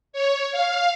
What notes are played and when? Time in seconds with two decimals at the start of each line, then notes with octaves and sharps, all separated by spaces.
0.13 C#5
0.52 F5